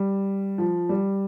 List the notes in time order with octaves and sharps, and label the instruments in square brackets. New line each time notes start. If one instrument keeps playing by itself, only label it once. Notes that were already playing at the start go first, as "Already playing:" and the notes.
Already playing: [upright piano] G3
F3
G3